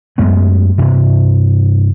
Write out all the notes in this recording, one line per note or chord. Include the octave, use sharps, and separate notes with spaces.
F#2 G#3 A3 B3
G2 C3